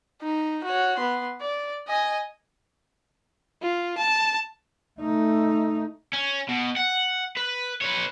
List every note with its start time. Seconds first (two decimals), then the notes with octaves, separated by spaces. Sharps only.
0.22 D#4
0.64 F#4 C#5
0.97 B3 C6
1.41 D5
1.88 D#5 G#5
3.62 F4
3.97 A5
5.00 A3 D#4
6.13 C#4
6.49 B2
6.77 F#5
7.37 B4
7.81 B4 C#5